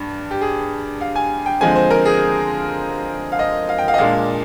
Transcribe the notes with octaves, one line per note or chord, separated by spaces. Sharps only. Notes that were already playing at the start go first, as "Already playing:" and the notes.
Already playing: G2 D4
G4
G#4
F5
G#5
G5
D3 F3 G#3 C4 G#5
C5
A#4
G#4
F5
D#5
F5
G5
F5
D#5
A#2 G#3 D4 F5